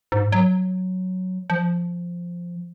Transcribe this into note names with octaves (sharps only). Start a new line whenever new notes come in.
G#2
F#3
F3